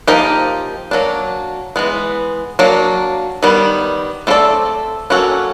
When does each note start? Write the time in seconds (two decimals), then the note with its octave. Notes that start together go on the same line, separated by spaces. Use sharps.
0.07 F3 A#3 D#4 G4 A#4
0.91 F#3 A#3 D4
1.76 E3 G#3 B3
2.59 F#3 A#3 D4
3.43 D#3 G3 B3
4.27 A3 C4 F4 A4 D5
5.10 F#3 A#3 C#4 F#4 A4